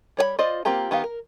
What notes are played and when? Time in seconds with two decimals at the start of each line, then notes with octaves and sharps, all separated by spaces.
0.17 G3 C#5 D5 B5
0.39 F4 C5 D5 D#5
0.65 A#3 C4 F4 G4 A#5
0.91 D#3 B3 G4 F5
1.04 A#4